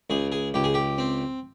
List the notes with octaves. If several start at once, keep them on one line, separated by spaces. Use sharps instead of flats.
C#2 G#4
G#4
C#2 G4
G#4
G4
C4